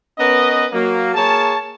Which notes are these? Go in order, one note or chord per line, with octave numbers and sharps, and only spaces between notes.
B3 C#4 A#4 B4 D#5
F#3 A#3
A#3 G#4 C#5 A5